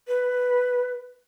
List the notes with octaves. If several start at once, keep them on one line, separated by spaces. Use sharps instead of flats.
B4